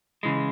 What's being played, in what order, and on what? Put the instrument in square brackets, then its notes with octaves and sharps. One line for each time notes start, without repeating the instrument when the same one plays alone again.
[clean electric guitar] C#3 E3 G#3